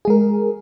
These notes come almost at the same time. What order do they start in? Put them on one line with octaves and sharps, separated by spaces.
G#4 G#3 A#4